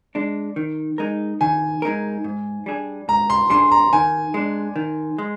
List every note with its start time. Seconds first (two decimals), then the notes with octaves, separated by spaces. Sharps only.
0.15 G#3 D4
0.56 D#3
0.98 G#3 D#4 A#4
1.41 D#3 G#5
1.82 G#3 D#4 A#4
2.24 G#2
2.66 G3 D4 G#4
3.08 G#2 A#5
3.30 C6
3.50 G3 D4 G#4 C6
3.71 A#5
3.93 D#3 G#5
4.34 G#3 D4
4.76 D#3
5.18 G#3